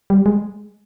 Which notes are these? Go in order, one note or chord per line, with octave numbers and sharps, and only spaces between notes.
G3
G#3